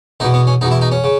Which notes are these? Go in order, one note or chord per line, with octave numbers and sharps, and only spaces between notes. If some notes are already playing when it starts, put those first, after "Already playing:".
E2 B2 D#4
B3
C#4
E2 B2 D#4
E4
D#4
C#4
C#3